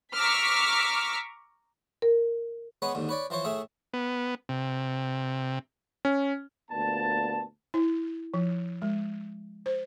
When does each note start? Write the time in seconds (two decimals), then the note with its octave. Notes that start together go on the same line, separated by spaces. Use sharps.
0.15 A#5 C#6 D6 E6 F6 B6
2.02 A#4
2.82 G#3 B3 B4 C#5
2.95 D#2 G#2 D3
3.09 B4 C#5 D5
3.30 E3 F3 C5 C#5
3.45 A2 A3 G#4 E5
3.93 B3
4.49 C3
6.05 C#4
6.71 D2 A#2 B3 A5
7.74 E4
8.34 F3
8.82 G#3
9.66 C5